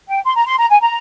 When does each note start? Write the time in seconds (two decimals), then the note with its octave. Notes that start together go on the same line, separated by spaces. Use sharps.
0.08 G5
0.24 C6
0.36 A#5
0.47 C6
0.58 A#5
0.70 G#5
0.81 A#5